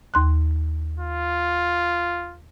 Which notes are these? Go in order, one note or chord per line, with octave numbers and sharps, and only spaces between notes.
D#2 C6 F#6
F4